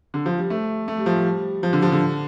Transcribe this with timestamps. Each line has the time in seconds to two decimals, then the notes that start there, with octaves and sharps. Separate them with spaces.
0.14 D3
0.26 F3
0.38 G3
0.50 A3
0.88 A3
0.97 G3
1.06 F3
1.15 G3
1.63 F3
1.73 D3
1.82 F3
1.92 D3